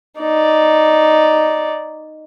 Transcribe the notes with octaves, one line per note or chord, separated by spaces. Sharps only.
D#4 D5